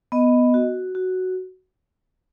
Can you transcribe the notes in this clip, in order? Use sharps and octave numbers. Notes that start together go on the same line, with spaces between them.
B3 D#5
F#4
F#4